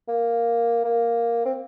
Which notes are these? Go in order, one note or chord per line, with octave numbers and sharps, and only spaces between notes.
A#3
A#3
C4